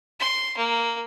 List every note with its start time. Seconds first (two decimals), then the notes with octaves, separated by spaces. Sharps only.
0.20 C6
0.58 A#3